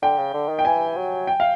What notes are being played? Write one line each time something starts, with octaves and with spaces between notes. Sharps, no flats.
D3 G5
C#3
D3
D#3
G5
E3 G#5
F#3
G5
F5